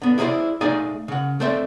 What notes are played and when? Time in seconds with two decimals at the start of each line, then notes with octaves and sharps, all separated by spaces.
0.02 D3 B3
0.18 E4 G#4 A4 B4 C5 D5
0.61 A3 D#4 G#4 D5 F5 G#5
1.08 C#3 F#5
1.40 A3 C4 A4 C5 D5 E5